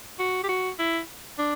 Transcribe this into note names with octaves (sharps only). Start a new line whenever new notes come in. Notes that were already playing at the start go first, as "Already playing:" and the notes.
F#4
G4
F#4
E4
D4